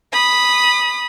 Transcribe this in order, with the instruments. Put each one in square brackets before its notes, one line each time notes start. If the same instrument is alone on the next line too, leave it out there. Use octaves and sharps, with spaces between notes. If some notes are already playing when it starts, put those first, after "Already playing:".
[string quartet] B5 D#6